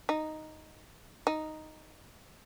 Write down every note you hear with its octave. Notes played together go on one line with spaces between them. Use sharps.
D#4
D#4